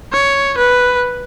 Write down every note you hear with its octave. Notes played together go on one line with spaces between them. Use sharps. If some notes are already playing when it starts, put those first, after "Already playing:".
C#5
B4